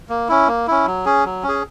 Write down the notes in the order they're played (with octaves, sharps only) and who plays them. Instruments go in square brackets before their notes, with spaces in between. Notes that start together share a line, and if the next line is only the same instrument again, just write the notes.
[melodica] A#3
C#4 E4
A#3
C#4 E4
F#3
C#4 G#4
F#3
C#4
G#4